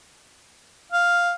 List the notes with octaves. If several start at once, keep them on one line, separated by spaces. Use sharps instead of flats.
F5